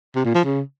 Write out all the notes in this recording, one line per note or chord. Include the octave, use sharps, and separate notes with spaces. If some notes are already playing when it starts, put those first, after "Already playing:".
C3
A#2
F3
C#3